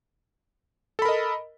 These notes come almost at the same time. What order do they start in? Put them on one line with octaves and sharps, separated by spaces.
A4 B5 A#4 D#5